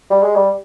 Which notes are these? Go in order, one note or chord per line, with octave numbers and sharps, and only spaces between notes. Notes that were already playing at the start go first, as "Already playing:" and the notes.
G3
G#3
G3